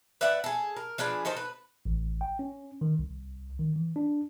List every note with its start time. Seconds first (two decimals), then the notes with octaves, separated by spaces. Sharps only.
0.21 B4 D5 E5 F#5
0.44 G#4 A4
0.76 A#4
0.98 F3 D4 G#4 B4
1.25 D#4 A4 A#4 C5
1.37 B4
1.86 A1
2.21 G5
2.39 C#4
2.81 D#3
2.99 C2
3.59 D#3
3.76 E3
3.96 D4